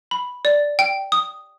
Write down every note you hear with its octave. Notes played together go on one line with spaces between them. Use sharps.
B5
D5
G5
D#6